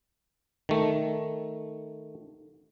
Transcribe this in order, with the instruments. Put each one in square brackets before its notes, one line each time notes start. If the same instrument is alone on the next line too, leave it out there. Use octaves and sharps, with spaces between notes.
[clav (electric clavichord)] D#3 A3